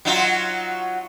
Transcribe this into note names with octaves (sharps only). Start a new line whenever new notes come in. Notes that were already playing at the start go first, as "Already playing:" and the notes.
F#3 D#4 F4